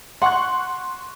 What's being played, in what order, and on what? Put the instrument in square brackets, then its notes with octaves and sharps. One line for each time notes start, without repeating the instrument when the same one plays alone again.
[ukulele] F#5 [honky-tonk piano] C6 C#6 F#6